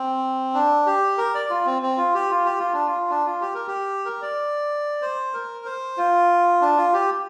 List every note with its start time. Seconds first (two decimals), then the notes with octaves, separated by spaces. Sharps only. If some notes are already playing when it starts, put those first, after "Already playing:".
Already playing: C4
0.54 D4
0.86 G4
1.18 A#4
1.34 D5
1.50 F4
1.66 C4
1.82 C4
1.97 F4
2.14 G4
2.30 F4
2.45 G4
2.60 F4
2.73 D4
2.87 F4
3.10 D4
3.26 F4
3.41 G4
3.54 A#4
3.67 G4
4.05 A#4
4.22 D5
5.02 C5
5.34 A#4
5.65 C5
5.97 F4
6.61 D4
6.77 F4
6.93 G4